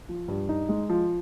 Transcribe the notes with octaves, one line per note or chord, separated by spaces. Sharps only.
F3
G2
D#4
G#3
F3